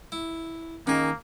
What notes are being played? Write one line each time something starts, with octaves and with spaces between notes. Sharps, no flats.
E4
D#3 A#3 C#4 D#4 G#4